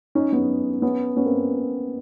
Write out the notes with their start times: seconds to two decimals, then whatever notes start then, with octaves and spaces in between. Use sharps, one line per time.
0.15 C#4 D#4
0.33 B3 C#4
0.82 B3 C#4
1.16 B3 C#4
1.25 A#3 C4